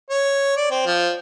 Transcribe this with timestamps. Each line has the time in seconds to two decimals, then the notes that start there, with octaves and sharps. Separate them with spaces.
0.10 C#5
0.57 D5
0.71 C4
0.86 F3